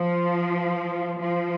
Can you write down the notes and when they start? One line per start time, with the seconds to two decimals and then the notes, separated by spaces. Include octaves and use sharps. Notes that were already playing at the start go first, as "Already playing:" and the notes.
Already playing: F3
1.21 F3